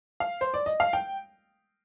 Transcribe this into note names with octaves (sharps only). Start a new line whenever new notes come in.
F5
C5
D5
D#5
F5
G5